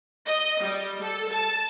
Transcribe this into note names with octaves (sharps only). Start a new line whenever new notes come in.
D#5
G3
A4
A5